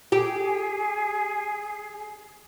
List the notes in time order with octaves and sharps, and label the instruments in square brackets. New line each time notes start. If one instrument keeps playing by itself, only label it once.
[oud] G4 [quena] G#4